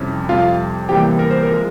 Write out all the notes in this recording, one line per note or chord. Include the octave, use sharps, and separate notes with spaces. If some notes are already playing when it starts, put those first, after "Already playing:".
Already playing: F2 C3 G3 C#4 E4
F2 C3 G3 F4 F5
E2 C3 E3 G3 A#3 G4 G5
A#4
C5
A#4
F3 G#3